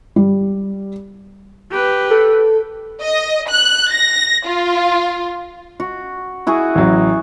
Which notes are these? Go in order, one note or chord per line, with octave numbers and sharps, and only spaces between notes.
G3
G4 B4
A4
D#5
F#6
A#6
F4
F#4
E4 F#4 G#4
A1 F#3